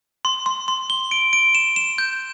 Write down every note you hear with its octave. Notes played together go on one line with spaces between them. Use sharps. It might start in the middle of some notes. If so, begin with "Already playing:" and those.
C6
C6
C6
G7
D7
D7
E7
E7
G6